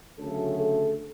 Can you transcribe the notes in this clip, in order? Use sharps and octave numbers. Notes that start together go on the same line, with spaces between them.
D2 C#3 F#3 A3 A4
A4